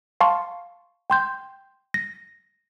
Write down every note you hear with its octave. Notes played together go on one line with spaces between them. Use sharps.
F5 A5 C6 C#6
G5 C6 G6
A#6